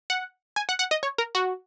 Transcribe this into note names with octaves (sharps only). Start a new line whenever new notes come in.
F#5
G#5
F#5
F#5
D#5
C#5
A#4
F#4